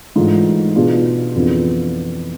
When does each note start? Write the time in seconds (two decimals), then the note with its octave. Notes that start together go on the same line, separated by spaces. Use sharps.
0.15 G#2 E3 A3 D4 F4
0.75 B2 G#3 B3 D4 F4
1.35 F2 E3 B3 D4 F4